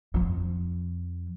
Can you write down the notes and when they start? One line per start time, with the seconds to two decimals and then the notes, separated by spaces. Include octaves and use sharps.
0.14 F2 F3